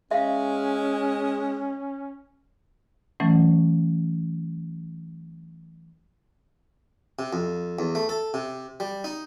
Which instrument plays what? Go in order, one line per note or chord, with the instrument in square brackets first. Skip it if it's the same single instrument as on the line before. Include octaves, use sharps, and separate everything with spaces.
[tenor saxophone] G#3 [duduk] C#4 [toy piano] E5 F5
[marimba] E3 F#3 A3 C#4
[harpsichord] C3
F2
E2
A3
A4
C3
G3
D#4